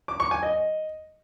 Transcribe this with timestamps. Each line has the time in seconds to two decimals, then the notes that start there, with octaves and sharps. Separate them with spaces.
0.08 D6
0.20 C#6
0.31 G#5
0.43 D#5